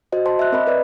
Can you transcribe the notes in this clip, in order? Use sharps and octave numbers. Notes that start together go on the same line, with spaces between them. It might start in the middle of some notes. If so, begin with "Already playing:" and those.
F#4 C5 D#5
C5 A5 C6
E5 F#6
C4 A#4 D#5 B5
A#4 B4 D5